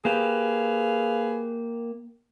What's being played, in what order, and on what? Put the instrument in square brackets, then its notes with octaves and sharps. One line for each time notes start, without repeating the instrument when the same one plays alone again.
[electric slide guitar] A#3 G4 [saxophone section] G#4 B4 F5